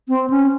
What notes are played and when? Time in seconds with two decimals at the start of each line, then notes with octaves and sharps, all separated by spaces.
0.09 C4
0.30 C#4